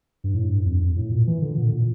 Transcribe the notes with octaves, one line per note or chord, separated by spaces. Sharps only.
G2
A2
G2
F2
F2
A2
A#2
E3
D3
A#2
A#2